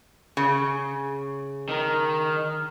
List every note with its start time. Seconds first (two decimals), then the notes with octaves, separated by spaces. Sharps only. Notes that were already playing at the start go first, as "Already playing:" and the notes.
0.37 C#3
1.69 D#3